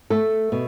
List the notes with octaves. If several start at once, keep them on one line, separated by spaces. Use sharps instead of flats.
A3 A4
B2